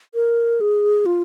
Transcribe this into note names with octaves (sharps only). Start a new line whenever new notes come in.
A#4
G#4
F4